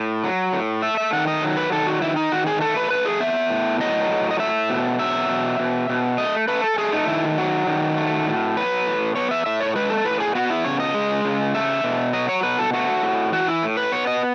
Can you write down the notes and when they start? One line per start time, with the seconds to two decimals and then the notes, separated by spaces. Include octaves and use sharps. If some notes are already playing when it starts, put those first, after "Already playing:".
Already playing: A2
0.24 F#3
0.53 A2
0.83 A3 E5
0.97 E5
1.13 D#3 F#5
1.28 D#5
1.42 F#3
1.57 B4
1.72 D#3 A4
1.87 F#4
2.02 D#3 E4
2.16 D#4
2.32 D#3 F#4
2.47 G#4
2.61 A3 A4
2.77 B4
2.90 A3 B4
3.06 G#4
3.20 B3 E5
3.50 A2
3.80 F#3 D#5
4.10 A2
4.31 D#5
4.39 A3 E5
4.70 B2
4.99 F#3 E5
5.29 B2
5.59 B2
5.89 B2
6.18 A3 D#5
6.48 A3 B4
6.64 A4
6.78 A3 G#4
6.93 D#4
7.07 D#3 E4
7.38 F#3 F#4
7.67 D#3
7.98 A3
8.27 A2
8.57 F#3 B4
8.86 A2
9.16 B3 C#5
9.31 E5
9.46 A2 E5
9.60 C#5
9.75 G#3 B4
9.90 A4
10.05 A2 B4
10.20 G#4
10.35 B3 F#4
10.50 E4
10.64 C#3 C#5
10.80 D#5
10.95 G#3
11.25 C#3
11.55 A3 E5
11.84 B2
12.13 F#3 D#5
12.29 C#5
12.43 B2 B4
12.59 A4
12.73 A3 F#4
13.03 A2
13.32 E3 F#4
13.48 E4
13.63 A2
13.77 B4
13.92 B3 C#5
14.07 D#5